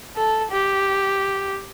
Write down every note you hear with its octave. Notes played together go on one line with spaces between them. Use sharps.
A4
G4